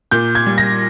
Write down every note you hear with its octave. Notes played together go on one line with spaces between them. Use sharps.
A#2 G6
G#6
G3
A#6